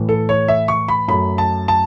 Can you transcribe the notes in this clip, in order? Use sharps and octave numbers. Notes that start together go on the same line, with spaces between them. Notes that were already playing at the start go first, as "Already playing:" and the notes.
Already playing: A2 E3 A3
A4
C#5
E5
C#6
B5
F#2 F#3 A3 B5
A5
A5